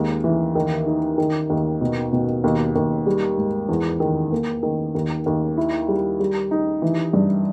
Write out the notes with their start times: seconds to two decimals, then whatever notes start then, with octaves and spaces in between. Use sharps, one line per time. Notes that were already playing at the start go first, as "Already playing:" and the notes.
Already playing: D#2 G#3
0.24 E3
0.55 D#3
0.86 D#4
1.18 D#3
1.50 D#2
1.81 B2
2.13 B2
2.44 D#2
2.76 D#2
3.06 G3
3.37 G#2
3.69 E2
4.00 D#3
4.32 A#3
4.63 D#3
4.95 D#2
5.26 D#2
5.57 E4
5.88 G3
6.20 G3
6.51 D#4
6.82 E3
7.13 G2